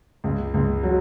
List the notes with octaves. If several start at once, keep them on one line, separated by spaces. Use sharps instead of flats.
C#2
C#2
F#3